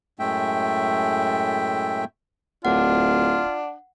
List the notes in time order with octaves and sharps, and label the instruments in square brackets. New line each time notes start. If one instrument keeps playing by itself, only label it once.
[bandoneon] F#2 A2 G#3 A3 E5 G5
[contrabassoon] D1 [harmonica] D4 [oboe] F4 [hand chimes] F#5